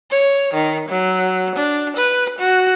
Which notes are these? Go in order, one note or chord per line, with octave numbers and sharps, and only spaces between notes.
C#5
D#3
F#3
D4
B4
F#4